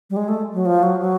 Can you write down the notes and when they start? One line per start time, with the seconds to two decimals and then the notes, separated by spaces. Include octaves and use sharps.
0.10 G3
0.17 G#3
0.28 A3
0.53 F#3
0.66 F3
0.83 F#3
1.00 F#3